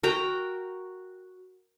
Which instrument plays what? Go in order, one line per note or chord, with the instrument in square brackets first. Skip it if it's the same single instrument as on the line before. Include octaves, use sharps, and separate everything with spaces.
[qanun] F#4 A#4 G5 A#5